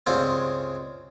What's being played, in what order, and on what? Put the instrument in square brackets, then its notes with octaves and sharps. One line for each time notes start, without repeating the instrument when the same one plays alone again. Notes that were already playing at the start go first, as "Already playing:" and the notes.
[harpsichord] C#2 G2 C#3 G#3 C4